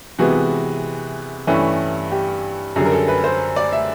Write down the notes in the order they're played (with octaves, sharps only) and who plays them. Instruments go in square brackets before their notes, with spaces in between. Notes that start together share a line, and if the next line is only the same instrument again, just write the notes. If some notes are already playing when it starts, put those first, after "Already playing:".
[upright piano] C3 E3 G#3 B3 F#4
G2 E3 A3 C#4 E4 G4
G4
F#2 D3 G3 G#4
A#4
A4
B4
C5
D5
E5